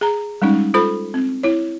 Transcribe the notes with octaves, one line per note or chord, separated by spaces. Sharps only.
G#4 A#5
G3 G#3 C#4 D#4
F4 A4 C5 B5
C4
E4 C#5